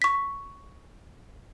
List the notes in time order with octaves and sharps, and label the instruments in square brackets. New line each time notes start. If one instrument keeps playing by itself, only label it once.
[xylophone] C#6 B6